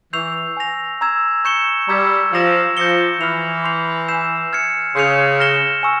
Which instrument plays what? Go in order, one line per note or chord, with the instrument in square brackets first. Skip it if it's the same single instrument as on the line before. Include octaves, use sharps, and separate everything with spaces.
[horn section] E3 [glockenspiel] C#6 E6 G6 C7 F7
[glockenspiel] G#5 E6 A#6 F7
A#5 E6 G#6 E7
C#6 G6 C#7 E7 G7
[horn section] G3 [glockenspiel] A#5 E6 G#6
[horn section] F3 [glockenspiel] E6 A#6 E7
[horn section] F3 [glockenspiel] G6 A#6 C#7 G7
[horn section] E3 [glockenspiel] F6 C7 F7
[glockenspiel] C6 G6 C7 F7
G#5 E6 G6 C7 E7
F6 G#6 C#7
[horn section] C#3 [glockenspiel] C6 G6 C#7 F7
[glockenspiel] F6 A#6 C#7 E7 G7
G#5 C#6 E6